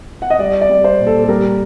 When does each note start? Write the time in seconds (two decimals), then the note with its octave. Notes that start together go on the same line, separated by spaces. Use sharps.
0.22 F#5
0.30 D#5
0.39 G3 D5
0.61 D5
0.70 G3
0.84 C5
0.99 A#2
1.07 A4
1.24 A4
1.28 G3 A#4